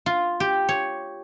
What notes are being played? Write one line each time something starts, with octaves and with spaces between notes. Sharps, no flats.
F4
G4
C#5